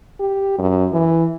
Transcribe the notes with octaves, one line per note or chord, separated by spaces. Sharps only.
G4
F#2
E3